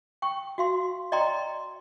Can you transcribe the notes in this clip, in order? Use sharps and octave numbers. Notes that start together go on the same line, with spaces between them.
G5 C#6
F#4 F5 C6
D5 D#5 G5 A#5 C6